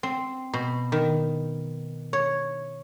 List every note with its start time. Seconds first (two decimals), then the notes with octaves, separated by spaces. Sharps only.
0.03 C4
0.53 B2
0.92 D#3
2.13 C#5